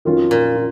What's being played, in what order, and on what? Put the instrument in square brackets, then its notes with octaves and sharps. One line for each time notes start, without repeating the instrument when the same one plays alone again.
[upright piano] F2 D#3 F#3 C#4 F4
[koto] A#2
[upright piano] F4